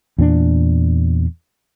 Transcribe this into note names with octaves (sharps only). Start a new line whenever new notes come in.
E2 A#2 C4 D4